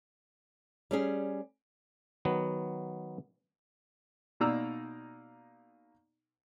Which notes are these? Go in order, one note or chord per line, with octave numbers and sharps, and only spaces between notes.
G3 C#4 G#4
D#3 F#3 B3
B2 A#3 D#4 D5 A#5 E6